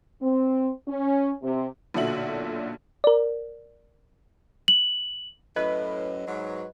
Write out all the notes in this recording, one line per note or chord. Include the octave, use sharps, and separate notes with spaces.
C4
C#4
C3
B1 A#2 D3 F#4 E5 F#7
A#4 D5
F#7
F#2 A2 B4 D#5
G#2 F#3